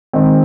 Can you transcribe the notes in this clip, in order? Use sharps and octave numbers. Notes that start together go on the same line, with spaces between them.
D#3 G#3 C4